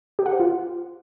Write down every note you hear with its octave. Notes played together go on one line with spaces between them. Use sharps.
G4
F#5
C5
F4